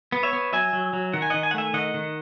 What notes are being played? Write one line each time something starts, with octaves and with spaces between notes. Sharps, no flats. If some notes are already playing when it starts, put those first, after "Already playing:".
B3
C#5 E5
B3
F#3 E5 G#5
F#3
F#3
D#3 F#5
G#5
D#3 D#5 F#5
G#5
F#5
A3 E5 G#5
D#3 D#5 F#5
D#3